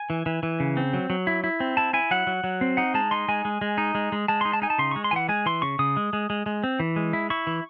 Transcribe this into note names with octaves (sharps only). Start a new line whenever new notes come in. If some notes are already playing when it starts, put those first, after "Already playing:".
Already playing: G#5
E3
E3
E3
C#3
C4
F#3
F#3
E4
E4
C4
E4 A5
E4 G#5
F#3 F#5
F#3
F#3
C4
D#4 F#5
G#3 A5
D#4 C6
G#3 G#5
G#3
G#3
D#4
G#3
G#3
G#3 A5
D#4 C6
A5
D#4 G#5
A5
C#3 C6
G#3 C#6
C6
E3 F#5 G#5
G#3 G#5
E3 C6
C#3 C#6
C#3 D#6
G#3
G#3
G#3
G#3
C4
E3
G#3
E4
E4 C#6
E3